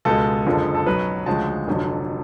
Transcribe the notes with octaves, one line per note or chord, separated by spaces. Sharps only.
C#2 B2 G#3 A4
F#1 F2 D3 F3 G#3
A4
B1 B2 F#3 B4
D2 C#3 F3 G#3 A5
F1 F2 D3 F#3